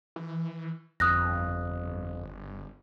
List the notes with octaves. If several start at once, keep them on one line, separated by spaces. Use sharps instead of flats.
E3
G1 F2 D#6 F#6 A#6